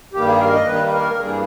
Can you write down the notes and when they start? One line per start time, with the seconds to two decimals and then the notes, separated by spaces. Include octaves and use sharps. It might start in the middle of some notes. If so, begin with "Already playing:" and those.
0.13 G2 D#3 G3 A#3 G4
0.27 G#4
0.40 A#4
0.53 D#5
0.66 G2 D#3 G3 A#3 B4
0.87 B4
0.93 A#4
1.19 G2 E3 G3 A#3 G#4